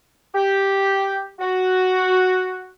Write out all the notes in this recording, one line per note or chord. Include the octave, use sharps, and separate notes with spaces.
G4
F#4